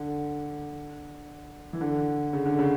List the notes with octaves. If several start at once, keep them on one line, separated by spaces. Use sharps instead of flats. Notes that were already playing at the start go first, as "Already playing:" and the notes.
Already playing: D3
E3
D3
C#3
D3
C#3